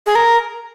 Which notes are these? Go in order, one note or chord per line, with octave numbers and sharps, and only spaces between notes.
G#4
A#4